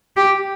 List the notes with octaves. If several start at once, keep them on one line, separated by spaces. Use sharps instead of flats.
G4